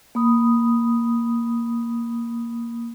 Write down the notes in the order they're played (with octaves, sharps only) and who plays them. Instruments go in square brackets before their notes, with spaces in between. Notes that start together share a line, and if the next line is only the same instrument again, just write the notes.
[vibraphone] A#3 B5 D#6